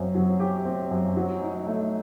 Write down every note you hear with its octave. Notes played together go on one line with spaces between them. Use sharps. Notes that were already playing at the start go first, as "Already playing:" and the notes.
Already playing: F#2 C4
F#3
G4
C4
F#2
F#3
D#4
A3